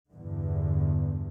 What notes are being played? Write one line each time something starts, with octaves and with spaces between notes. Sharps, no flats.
E2 G2 D3